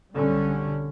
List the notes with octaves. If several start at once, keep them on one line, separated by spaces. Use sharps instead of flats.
B1 D3 G3 C#4